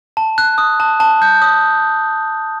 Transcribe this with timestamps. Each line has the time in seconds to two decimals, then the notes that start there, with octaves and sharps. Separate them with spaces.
0.17 A5
0.38 F#6
0.58 D#6
0.80 A5
1.00 A5
1.22 G6
1.42 D#6